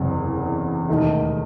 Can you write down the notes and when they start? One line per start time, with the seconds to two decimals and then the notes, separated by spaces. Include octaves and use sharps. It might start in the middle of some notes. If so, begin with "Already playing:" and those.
Already playing: F#1 E2 C3 F#3 C4
0.89 E1 D#2 D#3 A3 D#4